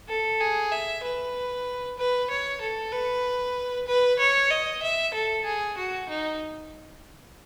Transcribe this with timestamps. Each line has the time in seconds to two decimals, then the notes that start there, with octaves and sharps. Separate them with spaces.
0.09 A4
0.41 G#4
0.72 E5
1.03 B4
1.98 B4
2.30 C#5
2.61 A4
2.92 B4
3.87 B4
4.19 C#5
4.50 D#5
4.83 E5
5.14 A4
5.45 G#4
5.78 F#4
6.09 D#4